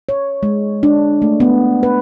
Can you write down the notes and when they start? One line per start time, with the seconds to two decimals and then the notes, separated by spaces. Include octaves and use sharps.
0.09 C#5
0.43 G#3
0.83 D4
1.22 A3
1.40 B3
1.83 B4